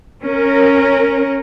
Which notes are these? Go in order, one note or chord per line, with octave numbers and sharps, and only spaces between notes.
C#4 A#4